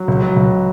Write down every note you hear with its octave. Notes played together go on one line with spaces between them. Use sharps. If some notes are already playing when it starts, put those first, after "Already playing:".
Already playing: F#3
C#2
F#3
C#2